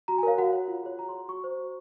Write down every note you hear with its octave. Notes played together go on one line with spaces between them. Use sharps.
F#4 A#5
G#5
A#4 C#5 F5
F#4 F#5
C#5
F4
G#4 C#5
F#4 A#5
C#5 C6
F#4 C#6
C5
F#4